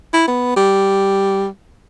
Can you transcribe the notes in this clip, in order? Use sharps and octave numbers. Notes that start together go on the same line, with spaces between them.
E4
B3
G3